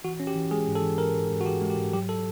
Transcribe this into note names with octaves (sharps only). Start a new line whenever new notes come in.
E3 F#4
C#4
G4
E3
G#3 G#4
G#2
A4
E3
G#2 A#4
G#2
G#2
F#4
E3 G4
G#3
G4
G#2
F#3 G4
A4